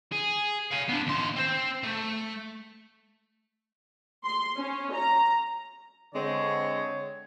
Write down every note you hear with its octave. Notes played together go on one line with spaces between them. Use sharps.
G#4
F5 G#5
B3 D4
D#2 C6
C4 C5
A3
C6
C#4
A#5
D3 G#3 C4 C#5